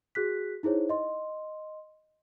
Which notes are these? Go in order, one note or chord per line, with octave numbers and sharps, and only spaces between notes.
F#4 G#4 F#6 B6
D#4 E4 G#4 C5 C#5
D#5 C6